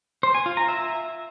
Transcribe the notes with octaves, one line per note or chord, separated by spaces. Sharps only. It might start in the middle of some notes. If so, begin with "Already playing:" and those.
C5
G#5
F4
A#5
E5